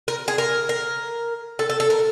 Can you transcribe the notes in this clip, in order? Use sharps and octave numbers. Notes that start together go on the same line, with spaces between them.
A#4
G#4
A#4
A#4
A4
A4
A4
A#4